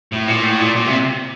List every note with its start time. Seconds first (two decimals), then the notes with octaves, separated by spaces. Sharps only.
0.12 A2
0.28 A#2
0.43 A2
0.59 A#2
0.76 A#2
0.86 C3